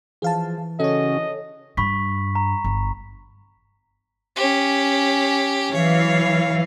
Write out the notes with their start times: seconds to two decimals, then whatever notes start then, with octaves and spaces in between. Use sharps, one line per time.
0.22 E3 F3 G#4 F5 A5
0.80 C#3 C#4 F#4 A4 C#5 D#5
1.77 G2 B5 C#6 B6
2.35 A#5
2.64 G1
4.36 C#4 G4
5.74 E3 F#3 C#5 F5